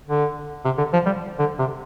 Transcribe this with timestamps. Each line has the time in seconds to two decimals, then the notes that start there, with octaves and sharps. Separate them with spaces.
0.08 D3
0.65 C3
0.78 D3
0.93 F3
1.06 G3
1.39 D3
1.59 C3